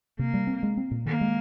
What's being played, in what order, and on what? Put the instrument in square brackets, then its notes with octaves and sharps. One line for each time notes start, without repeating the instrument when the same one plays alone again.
[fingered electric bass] C3 [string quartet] A#3
[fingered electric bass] G3
C4
G#3
C4
A#2
[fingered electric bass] D#3 [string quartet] A#3
[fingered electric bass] G#3